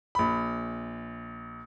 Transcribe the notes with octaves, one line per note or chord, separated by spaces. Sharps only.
A#1 B5